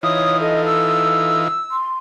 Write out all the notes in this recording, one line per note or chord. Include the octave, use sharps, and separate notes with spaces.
E3 D#4 F4 C#5 D#6
A4 D#5
E6
C6